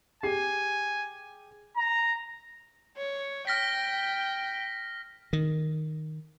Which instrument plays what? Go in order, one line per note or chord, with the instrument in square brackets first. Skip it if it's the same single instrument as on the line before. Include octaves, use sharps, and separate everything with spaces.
[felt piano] G4 G#4 C7 [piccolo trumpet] G#5
[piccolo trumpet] A#5
[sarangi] C#5
[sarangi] G5 [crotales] F6 A#6 B6
[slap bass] D#3